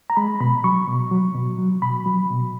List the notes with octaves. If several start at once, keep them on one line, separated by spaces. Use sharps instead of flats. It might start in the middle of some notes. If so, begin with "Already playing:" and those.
A#5
G#3 B5
B2 B5
F#3 C#6
B2
F#3
B2
F#3
B2 B5
F#3
B2